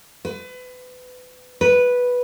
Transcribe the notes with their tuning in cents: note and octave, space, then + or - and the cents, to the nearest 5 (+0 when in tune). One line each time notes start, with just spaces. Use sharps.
B4 +30
B4 -5